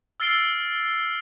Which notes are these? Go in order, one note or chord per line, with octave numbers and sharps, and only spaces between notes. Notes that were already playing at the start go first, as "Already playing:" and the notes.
E6 F6 A6 C7 D7 G7